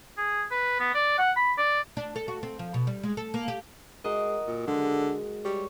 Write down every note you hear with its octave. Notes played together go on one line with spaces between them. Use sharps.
G#4
B4
B3
D5
F#5
B5
D5
D4
A4
F#4
C4
F3
B2
G3
G#3
A4
A#3
G4
G#3 F#4 A#4 D#5
A#2
D3 G#3
G3 C#5